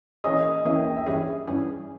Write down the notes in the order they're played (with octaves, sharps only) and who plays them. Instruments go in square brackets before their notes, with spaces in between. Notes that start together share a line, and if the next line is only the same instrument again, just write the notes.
[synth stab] E3 A#3 C#4 G#4 [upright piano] D#5 D#6
[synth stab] E3 A#3 C#4 G#4 [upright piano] E5
[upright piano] G5
G5
E5
[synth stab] G2 E3 G3 C#4 G#4
G2 E3 G3 C#4 G#4